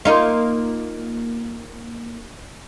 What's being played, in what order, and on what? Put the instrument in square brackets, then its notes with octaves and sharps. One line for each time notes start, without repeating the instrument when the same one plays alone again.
[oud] A#3 D#4 F4